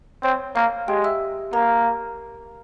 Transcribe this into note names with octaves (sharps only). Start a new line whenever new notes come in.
C4 C#5
A#3 F5
G#3 G4 G5
E5 E6
A#3 A#4 A#5